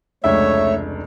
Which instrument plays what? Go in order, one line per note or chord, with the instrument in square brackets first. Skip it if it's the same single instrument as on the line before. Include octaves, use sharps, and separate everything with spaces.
[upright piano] F1 C#2 D4 [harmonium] A3 C#5 [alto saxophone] E5